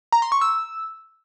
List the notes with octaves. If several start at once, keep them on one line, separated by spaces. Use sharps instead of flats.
A#5
C6
C#6
E6